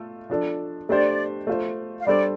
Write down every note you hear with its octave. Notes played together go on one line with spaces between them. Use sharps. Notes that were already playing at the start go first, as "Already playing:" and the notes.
Already playing: A3 F4 A4
F3 D4 A4
A3 D4 G4 C5 D5
A3 F4 C5
F5
G3 D4 A4 C5 D5